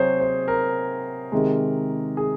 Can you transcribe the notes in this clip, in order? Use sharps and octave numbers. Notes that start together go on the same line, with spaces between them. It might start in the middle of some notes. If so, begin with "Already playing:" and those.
Already playing: C3 F#3 G#4 C5 C#5
C5
A#4
C3 D#3 G#3
G#4